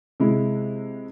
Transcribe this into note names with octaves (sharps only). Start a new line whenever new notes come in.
C3 G#3 E4